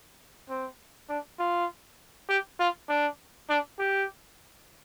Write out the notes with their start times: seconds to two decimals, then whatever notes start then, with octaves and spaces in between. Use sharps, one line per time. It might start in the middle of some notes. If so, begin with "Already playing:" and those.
0.49 C4
1.09 D4
1.39 F4
2.29 G4
2.59 F4
2.89 D4
3.50 D4
3.79 G4